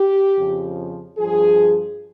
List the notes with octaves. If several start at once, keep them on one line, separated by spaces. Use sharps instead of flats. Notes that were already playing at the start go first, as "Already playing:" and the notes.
Already playing: G4
F2 C#3 F3
G2 F3 G#4